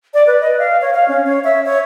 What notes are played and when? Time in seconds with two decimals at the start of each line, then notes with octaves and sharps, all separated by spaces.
0.14 D5
0.27 B4
0.41 D#5
0.59 F5
0.81 C#5
0.94 F5
1.08 C#4
1.26 C#5
1.44 E5
1.65 C#5